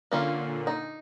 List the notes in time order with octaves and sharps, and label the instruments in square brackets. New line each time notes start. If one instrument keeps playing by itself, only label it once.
[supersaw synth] A#2 D3 [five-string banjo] A#3 C#4 F4
[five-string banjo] D#4